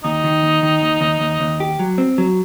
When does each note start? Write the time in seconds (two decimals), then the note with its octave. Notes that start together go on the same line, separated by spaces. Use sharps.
0.04 D#2 D#4
0.24 D#3
0.43 D#2
0.63 D#3
0.82 D#2
1.01 D#2
1.20 D#2
1.41 D#2
1.60 G4
1.79 F#3
1.98 C4
2.18 F#3